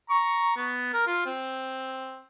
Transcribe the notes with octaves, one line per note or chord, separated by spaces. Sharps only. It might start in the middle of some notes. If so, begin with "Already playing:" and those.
A#5 C#6
B3
A#4
F4
C4